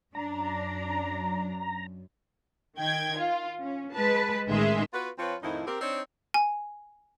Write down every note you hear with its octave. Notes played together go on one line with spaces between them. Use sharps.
F#2 D4 A#5
D#3 G5 G#6
F4
C#4
G#3 B4 A5
A1 D#3 G#3 G#4 E5 C6
B3 F4 F#4 B4
F3 C4 F4 B4 C#5
F2 A2 D#3 F3 D#4 E4
C4 G4 A#4
C4 D4 D#4 C5 C#5
G#5